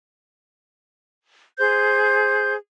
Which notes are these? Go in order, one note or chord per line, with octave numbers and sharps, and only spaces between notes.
G#4 C5 G6